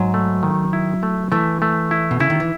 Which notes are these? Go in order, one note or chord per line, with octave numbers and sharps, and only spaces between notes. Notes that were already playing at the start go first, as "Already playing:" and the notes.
Already playing: G#2 F#3
A3
D#3
E4
A3
E3 A3
A3
E4
B2
C#3 E4
D#3
E3